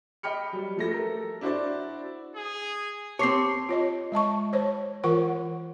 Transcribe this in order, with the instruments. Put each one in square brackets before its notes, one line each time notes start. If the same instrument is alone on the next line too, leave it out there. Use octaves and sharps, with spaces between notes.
[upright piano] D#5 G5 B5 F6 C#7
F#3 G3
F3 A3 A#6
A4 A#4
D4 E4 F#4 C5 D5
[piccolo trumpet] G#4
[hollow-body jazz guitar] C4 C#5 [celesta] G4 D6 [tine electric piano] A5 C7 [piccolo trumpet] C6
[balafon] F4 C#5 D#5
G#3 D#5 A5 C#6
C5 C#5
E3 F4 A#4 C#5 F#5 C#6